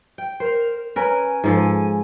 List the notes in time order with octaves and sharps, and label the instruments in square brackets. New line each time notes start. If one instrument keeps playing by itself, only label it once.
[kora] G5
[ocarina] A#4 [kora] C5
[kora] C#4 A#4 B4 [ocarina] G#5
[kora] G#2 F3 A4